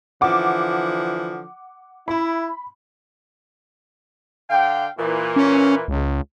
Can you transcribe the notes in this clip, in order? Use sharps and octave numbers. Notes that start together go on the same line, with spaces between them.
D3 E3 F3 F#5 D6
E4 B5
D3 F5 G5
A#2 E3
C#4
C#2